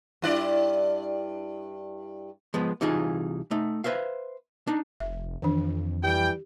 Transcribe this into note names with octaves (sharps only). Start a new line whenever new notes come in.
G2 E4 D5
F3 G#3 B3
C2 E3 D#4 F4 G#4
A3 D#4
B4 C5 E5 F5
D4 D#4
F1 E5
F2 D#3 E3 D4
E3 G3 G4 G5